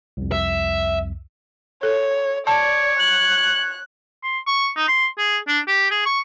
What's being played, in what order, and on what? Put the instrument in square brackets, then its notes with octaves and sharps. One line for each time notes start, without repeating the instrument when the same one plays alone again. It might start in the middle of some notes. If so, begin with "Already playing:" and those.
[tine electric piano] C2 F2
[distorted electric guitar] E5
[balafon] A4 [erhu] C#5
[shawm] C#5 [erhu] D5 [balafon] A5
[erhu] F#6 [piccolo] F#7
[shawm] C6
C#6
D#4
C6
G#4
D4
G4
G#4
C#6